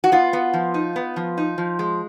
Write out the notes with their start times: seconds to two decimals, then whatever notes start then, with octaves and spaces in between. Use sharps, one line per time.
0.04 F#4
0.12 B3 F4
0.33 B3
0.54 F3
0.74 D#4
0.96 B3
1.16 F3
1.38 D#4
1.58 F3
1.79 G#3